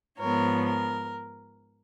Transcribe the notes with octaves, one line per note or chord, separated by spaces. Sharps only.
G#2 F3 B3 A#4 C#5
A#4